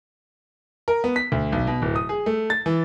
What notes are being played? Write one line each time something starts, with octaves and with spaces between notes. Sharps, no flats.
A#4
B3
B6
D2
B1
B2
D1
D#6
G#4
A3
A6
E3